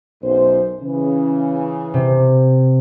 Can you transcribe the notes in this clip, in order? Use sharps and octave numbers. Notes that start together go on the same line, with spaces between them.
B1 F#2 C5
C#3 E3
C3